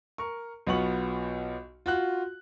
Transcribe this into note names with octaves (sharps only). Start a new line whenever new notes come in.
A#4 C#6
B1 B2 B3 F4 C#6 F#7
F4 F#4 F#6